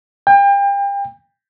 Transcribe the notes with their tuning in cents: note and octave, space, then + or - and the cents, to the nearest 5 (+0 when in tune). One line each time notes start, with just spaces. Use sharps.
G5 +35